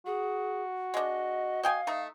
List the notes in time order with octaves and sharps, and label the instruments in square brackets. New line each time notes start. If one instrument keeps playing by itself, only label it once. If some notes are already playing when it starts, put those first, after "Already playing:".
[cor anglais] F#4 [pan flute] G#4
[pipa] G#3 D4 [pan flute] D#5
[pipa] D#5 G5 G#5 [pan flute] F5
[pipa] A3 D#4